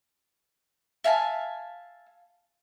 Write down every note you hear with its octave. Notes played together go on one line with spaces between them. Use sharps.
E5 F5 G#5 A5